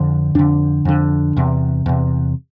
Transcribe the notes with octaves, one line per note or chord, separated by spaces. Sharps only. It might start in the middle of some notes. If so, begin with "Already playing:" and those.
Already playing: F2 D3
F2 D3 D4
F2 D3
E2 C3
E2 C3